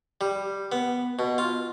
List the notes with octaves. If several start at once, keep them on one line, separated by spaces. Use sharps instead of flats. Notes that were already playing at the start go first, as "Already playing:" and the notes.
G3
B3
B2
F4